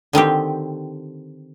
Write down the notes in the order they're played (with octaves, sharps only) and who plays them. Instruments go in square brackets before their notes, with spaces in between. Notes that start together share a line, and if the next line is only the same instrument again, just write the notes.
[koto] D3 D#3 C4 G4